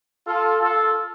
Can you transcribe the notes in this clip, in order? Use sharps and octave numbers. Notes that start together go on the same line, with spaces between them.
F4 A4
F4 A4